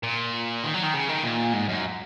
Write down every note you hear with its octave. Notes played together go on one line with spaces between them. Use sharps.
A#2
D#3
F#3
D#3
C#3
D#3
A#2
G#2
F#2